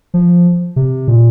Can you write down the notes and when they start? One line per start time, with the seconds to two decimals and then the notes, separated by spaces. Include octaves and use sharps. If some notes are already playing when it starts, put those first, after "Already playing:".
0.14 F3
0.76 C3
1.08 A#2